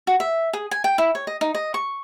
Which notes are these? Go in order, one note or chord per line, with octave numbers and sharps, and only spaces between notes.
F#4
E5
G#4
G#5
G5
E4
C#5
D#5
D#4
D#5
C#6